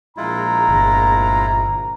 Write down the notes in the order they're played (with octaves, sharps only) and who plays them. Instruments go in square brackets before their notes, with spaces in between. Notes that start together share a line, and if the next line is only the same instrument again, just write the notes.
[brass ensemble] A#1 A#5 [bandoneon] G#3 E4 F4
[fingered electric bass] G1